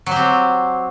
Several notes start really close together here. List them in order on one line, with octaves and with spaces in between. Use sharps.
F#3 G4 C4